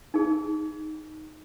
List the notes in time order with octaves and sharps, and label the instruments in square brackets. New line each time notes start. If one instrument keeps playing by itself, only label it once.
[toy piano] D#4 G#4